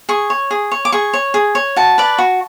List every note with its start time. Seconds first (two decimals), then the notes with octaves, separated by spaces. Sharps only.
0.09 G#4 C#6
0.30 C#5
0.51 G#4
0.72 C#5
0.85 D6
0.92 G#4 C#6
1.13 C#5
1.34 G#4
1.55 C#5
1.76 F#4 A5
1.98 B4 D5
2.18 F#4